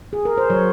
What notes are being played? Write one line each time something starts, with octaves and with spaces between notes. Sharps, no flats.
G#4
A#4
C5
F#3 C#5